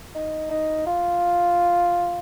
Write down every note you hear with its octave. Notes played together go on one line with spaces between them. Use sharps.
D#4
D#4
F4